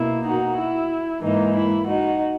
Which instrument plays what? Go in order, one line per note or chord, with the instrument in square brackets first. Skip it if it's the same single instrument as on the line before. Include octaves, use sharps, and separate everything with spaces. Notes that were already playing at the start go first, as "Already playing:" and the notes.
Already playing: [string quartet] B2 A#3 E4
D#4 F#4
E4
G#2 E3 A#3 D#4
E4
D#4 F#4